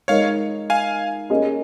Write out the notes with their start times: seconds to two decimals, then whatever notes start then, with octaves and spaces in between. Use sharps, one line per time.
0.08 G#3 D#4 A#4 C#5 D#5 F5
0.70 F5 G#5
1.30 A#3 C#4 G#4 D#5